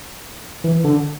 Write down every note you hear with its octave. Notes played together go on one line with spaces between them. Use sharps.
E3
D3